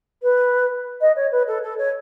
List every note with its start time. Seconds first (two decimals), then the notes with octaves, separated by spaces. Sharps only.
0.22 B4
1.01 D#5
1.16 C#5
1.32 B4
1.47 A4
1.63 A4
1.78 C#5